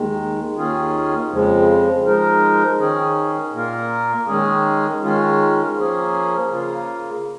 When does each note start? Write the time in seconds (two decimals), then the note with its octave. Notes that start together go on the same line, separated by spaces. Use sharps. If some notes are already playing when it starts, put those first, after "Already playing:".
Already playing: D#2 D#3 G#3
0.55 D#2 D#3 C#4 F4 G#4
1.28 F2 C#3 F3 G#3
2.03 F3 G#3 D#4 A#4
2.78 D#3 C#4 G#4
3.52 A#2 A#3 F4 A#4
4.27 D#3 G#3 C#4 G#4
5.01 D#3 G#3 C#4 F4
5.76 F3 A#3 C#4 G#4
6.50 C#3 A#3 F4